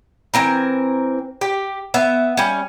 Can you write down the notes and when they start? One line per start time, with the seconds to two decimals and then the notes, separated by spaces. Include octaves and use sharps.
0.34 E3 C4 A#4
1.41 G4
1.94 B3 E5
2.37 G3 C#4